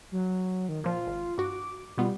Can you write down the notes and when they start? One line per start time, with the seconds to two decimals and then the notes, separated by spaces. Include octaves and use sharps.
0.12 F#3
0.69 D#3
0.84 A#2 F3 F4
1.07 G#1
1.38 G2 F#4 D6
1.98 B2 G3 B3 F4